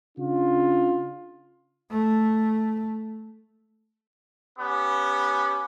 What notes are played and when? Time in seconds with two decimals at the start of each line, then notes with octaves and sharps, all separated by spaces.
0.18 C#3 D4 F4
1.91 A3
4.59 B3 C#4 G4